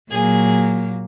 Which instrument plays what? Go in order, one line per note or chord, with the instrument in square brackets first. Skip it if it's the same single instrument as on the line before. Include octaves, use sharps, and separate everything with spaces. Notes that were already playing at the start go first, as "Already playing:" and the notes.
[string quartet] A#2 F#3 A#3 G#4